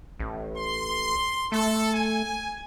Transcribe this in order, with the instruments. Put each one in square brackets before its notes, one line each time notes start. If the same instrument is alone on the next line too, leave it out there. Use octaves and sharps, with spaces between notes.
[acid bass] A1
[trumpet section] C6
[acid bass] A3 [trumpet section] A4
[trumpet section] G#5